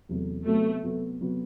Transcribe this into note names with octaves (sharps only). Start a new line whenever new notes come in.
E2 C3 F#3 A3
C3 F#3 A3 B3 F#4
C3 F#3 B3 F#4
C3 F#3 B3 F#4